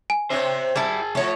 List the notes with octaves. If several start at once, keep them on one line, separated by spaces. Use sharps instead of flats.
G#5
C4 D4 C5 C#5 E5
G3 E4 G#4 A5
A2 F3 A3 C#5